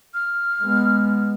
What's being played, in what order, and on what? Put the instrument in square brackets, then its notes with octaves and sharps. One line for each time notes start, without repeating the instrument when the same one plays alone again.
[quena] F6
[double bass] G#3 B3